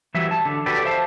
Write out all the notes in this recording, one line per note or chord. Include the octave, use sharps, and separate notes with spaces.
E3 F#3 G3 E5
A5
D3
F#4 G4 A4 B4 D5
C5 E5 F5 A5